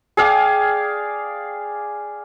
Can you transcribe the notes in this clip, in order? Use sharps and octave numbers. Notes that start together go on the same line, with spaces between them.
G#4 D5 F5 G5